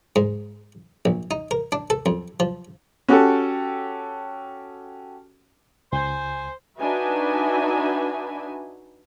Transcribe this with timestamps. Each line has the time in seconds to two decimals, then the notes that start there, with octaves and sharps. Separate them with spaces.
0.16 G#2
1.05 A#1
1.31 D#4
1.51 A#4
1.72 D4
1.90 A4
2.06 F2
2.40 F3
3.08 C#4 F#4 G4 A4
5.93 C#2 C5 G#5
6.80 D4 D#4 F#4 B4 E5 G#5